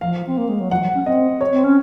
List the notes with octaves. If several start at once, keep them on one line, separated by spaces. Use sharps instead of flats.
F3 F5
C4
A#3
G#3
F#3
F3 F#5
F#3
C#4
C4 D#5
C#5
C4
C#4